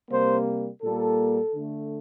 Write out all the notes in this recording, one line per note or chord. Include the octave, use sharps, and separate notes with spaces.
C3 G3 A#3 C5
A#2 G3 A#3 A4
D3 A3